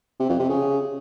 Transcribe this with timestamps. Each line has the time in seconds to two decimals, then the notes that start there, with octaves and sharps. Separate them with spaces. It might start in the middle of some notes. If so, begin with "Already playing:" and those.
0.19 C3
0.29 F2
0.39 C3
0.49 C#3